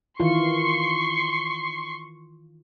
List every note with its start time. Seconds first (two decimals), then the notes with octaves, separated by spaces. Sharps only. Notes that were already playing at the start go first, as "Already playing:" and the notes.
0.20 D#3 E3 F4 C6 C#6 C7